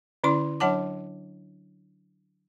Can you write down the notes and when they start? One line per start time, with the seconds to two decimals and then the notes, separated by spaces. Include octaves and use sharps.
0.24 D3 C#4 E4 D5 C6
0.60 F#3 D4 C#5 F#5 A5 D6